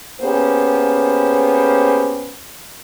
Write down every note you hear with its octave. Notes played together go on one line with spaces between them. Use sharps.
A#3 B3 C#4 G4 G#4 C5